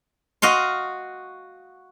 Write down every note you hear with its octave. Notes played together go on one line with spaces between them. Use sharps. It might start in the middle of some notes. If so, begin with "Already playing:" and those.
F#4 D#5 F5 C6